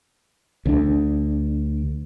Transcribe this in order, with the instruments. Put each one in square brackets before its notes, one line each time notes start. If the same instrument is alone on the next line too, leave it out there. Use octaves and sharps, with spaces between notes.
[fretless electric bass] D2 G3 D4